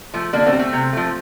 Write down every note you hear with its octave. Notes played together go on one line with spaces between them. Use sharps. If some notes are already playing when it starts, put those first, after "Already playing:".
F3 A3
D3 A#3 D4
A3 C4
G3
A3 C4
C3
F3 A3